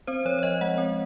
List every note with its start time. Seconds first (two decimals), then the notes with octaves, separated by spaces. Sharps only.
0.07 C4 C5
0.25 F3 C#5
0.39 C#5
0.43 F3 D#5
0.61 G#3 F#5
0.78 C4